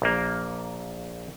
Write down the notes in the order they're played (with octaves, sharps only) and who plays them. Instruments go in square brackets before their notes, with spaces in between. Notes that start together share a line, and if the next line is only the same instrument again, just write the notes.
[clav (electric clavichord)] A#1 A#3